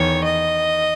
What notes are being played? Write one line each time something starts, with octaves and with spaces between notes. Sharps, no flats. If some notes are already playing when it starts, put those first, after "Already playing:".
Already playing: E2 D#3 C#5
D#5